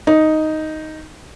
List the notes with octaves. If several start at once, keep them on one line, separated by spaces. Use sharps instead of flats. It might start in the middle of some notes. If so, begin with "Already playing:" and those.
D#4